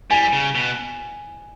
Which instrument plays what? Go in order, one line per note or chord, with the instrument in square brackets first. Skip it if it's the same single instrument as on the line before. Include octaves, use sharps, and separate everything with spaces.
[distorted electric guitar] G3 [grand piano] G#5
[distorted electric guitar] C#3
B2